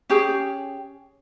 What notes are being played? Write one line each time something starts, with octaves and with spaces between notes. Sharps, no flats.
C#4 G4 G#4